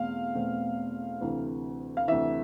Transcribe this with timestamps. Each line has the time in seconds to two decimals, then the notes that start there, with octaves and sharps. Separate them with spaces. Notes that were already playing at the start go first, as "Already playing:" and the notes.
Already playing: E2 B2 A3 C4 F5
0.35 E2 B2 A3 C4
1.21 D2 C3 E3
1.97 F5
2.07 D2 C3 E3 E5